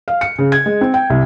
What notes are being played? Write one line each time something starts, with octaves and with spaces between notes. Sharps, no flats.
F5
C#7
C#3
G#6
G#3
C4
G5
C2